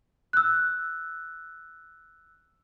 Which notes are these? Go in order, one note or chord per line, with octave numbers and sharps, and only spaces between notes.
E6 F#6